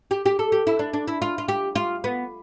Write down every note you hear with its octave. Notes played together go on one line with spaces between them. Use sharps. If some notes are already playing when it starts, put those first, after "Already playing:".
G4
G4
A4
G4
E4
D4
D4
E4
F4
F4
G4
F4
B3